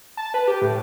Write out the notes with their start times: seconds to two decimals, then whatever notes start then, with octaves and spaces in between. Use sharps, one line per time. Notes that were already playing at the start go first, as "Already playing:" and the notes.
0.17 A5
0.34 B4
0.48 G4
0.62 A2